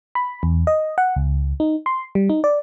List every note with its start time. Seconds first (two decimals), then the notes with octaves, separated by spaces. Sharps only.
0.15 B5
0.43 E2
0.67 D#5
0.98 F#5
1.16 C#2
1.60 D#4
1.86 C6
2.15 G3
2.30 D#4
2.44 D5